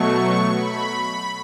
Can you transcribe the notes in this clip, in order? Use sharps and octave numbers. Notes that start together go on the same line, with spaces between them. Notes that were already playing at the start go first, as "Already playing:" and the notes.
Already playing: B2 F#3 A3 C#6
B5